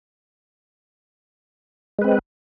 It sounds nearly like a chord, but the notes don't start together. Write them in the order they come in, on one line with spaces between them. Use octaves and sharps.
G#3 B4 C4